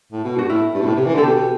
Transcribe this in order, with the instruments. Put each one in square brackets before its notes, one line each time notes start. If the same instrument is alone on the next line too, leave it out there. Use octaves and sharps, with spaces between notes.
[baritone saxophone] A2
B2
[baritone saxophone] G2 [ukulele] F#4
[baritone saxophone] A2 [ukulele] E4
[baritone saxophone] G2
B2
A2
C3
E3
[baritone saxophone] D3 [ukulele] A4
[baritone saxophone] B2 [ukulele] G4
[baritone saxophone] B2